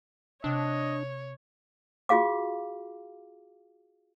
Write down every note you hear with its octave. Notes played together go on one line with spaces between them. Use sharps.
C3 D4 C#5 D#5 E6 F#6
F4 F#4 G#4 F5 D6